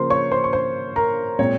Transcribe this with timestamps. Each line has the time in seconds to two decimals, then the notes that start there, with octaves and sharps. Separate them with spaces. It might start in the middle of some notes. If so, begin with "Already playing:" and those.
Already playing: C#3 F3 A#3 A#4 C5 C6
0.10 C#5 C#6
0.32 C5 C6
0.44 C#6
0.53 C5 C6
0.96 A#4 A#5
1.39 A#2 G#3 C4 C#5